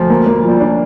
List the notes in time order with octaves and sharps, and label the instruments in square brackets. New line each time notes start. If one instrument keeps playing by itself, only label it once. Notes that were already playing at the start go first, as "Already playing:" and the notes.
Already playing: [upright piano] D2 [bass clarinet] F3
[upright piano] A#3
A#3
[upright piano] F3 [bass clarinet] G3
[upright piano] D4